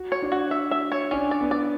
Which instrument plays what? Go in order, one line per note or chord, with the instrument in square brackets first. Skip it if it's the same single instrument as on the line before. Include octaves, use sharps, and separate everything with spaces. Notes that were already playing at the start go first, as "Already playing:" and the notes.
Already playing: [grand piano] F#4
[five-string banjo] C#5
[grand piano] D4
[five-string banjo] F#4
E5
E5
C#5
[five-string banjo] C#4 [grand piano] D4
[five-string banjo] D5
[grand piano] B3
[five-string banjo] D5